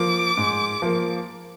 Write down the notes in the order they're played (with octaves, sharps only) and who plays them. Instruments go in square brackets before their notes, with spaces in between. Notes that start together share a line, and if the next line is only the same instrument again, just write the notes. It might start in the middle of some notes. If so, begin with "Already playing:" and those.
Already playing: [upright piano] F3 A#3 [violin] D6
[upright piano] G#2
F3 A#3